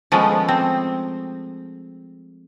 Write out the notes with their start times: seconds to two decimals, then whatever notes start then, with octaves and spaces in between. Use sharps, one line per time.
0.12 F3 G#3 A3 B3 C#4
0.49 C4